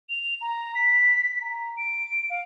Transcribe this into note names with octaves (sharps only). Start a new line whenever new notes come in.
F7
A#5
B6
A#5
D7
F5